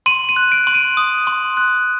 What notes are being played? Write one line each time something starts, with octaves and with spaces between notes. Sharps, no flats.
C6 D#7
D#7
F#6
D7
C6
D#7
D#6
C6
F#6